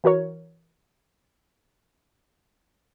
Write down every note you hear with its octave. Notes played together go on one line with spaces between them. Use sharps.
E3 F#4 A#4 C#5